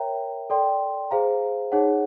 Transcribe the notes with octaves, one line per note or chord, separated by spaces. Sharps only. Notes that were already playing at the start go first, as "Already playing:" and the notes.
Already playing: A#4 C#5 E5 G5 A#5
A4 D5 G5 C6
G#4 C5 F5 A#5
D#4 G#4 C#5 F#5